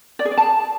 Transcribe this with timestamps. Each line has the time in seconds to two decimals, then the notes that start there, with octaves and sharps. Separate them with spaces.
0.19 D5
0.25 G#4
0.31 D5
0.37 A5